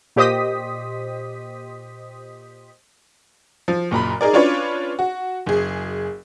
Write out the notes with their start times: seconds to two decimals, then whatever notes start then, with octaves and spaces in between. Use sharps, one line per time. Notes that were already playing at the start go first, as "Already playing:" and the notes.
0.16 A#2 G4 C5 D#5 D#6 B6
3.68 F3
3.91 F#1 A#2 A#5 B5
4.21 D#4 G#4 A#4 D5
4.33 C#4 D4 F4 B4 C#5 D5
4.99 F#4
5.46 F#1 G#4